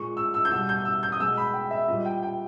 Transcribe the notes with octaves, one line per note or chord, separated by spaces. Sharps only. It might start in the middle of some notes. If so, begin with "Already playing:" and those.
Already playing: A#2 G#3 C#6
E6
E6
G6
B2 G3 E6
G6
E6
G6
D#6
B2 G#3 E6
B5
G5
E5
A#2 G3 D#5
G5
G5